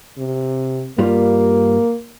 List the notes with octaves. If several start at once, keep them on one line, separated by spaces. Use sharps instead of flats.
C3
G2 G3 A#3 F4